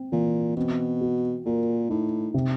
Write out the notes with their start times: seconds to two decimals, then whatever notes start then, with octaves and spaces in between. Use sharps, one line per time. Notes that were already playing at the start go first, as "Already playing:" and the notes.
Already playing: C4
0.12 A#2 E3
0.57 B2 C4
1.01 F#4
1.46 A#2 A#4
1.89 A2 D#4
2.34 C3